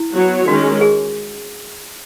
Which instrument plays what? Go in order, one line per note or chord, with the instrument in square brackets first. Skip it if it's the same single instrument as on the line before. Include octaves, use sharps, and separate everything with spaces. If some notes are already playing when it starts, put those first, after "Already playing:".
Already playing: [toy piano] E4
[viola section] F#3 B3 F#4 C#5
[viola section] D#3 G#3 C#4 [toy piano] F#4
[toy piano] G#4